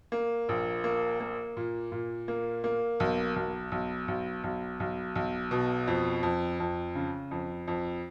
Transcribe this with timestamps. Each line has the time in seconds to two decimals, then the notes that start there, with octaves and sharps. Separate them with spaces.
0.12 A#3
0.49 A#1
0.84 A#3
1.20 A#3
1.57 A#2
1.92 A#2
2.28 A#3
2.64 A#3
3.00 B1
3.36 B1
3.72 B1
4.08 B1
4.44 B1
4.80 B1
5.15 B1
5.51 B2
5.87 F2
6.23 F2
6.60 F2
6.95 C#3
7.31 F2
7.68 F2